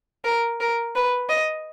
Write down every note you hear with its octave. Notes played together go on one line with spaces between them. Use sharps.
A#4
A#4
B4
D#5